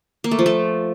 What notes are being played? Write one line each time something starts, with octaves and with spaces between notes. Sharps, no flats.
A#3
A3
F3
A3